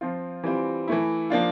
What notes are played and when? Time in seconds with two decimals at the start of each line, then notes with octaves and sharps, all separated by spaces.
0.01 F3 C4 F4
0.44 E3 G3 C4 F4
0.88 E3 A3 E4
1.30 F3 A#3 D4 F4